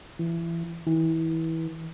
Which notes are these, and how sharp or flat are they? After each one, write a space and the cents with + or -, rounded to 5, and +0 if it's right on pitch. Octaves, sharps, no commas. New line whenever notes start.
E3 +25
E3 -25